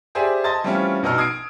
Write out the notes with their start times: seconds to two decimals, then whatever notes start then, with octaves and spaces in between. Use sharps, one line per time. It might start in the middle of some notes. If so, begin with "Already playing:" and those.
0.15 G4 G#4 C5 D5 E5 G#5
0.44 D#5 A5 C6 G#6 A6
0.63 E3 G3 A3 C4 C#4 F4
1.03 A#1 B2 D#4 D#5 E6 F6
1.18 D#6 G#6 C7 D7